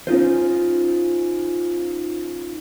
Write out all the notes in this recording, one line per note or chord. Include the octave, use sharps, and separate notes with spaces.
C#4 D#4 F4 C5